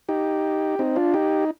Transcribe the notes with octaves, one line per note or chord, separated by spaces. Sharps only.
D#4 G4
C4 D#4
D4 F4
D#4 G4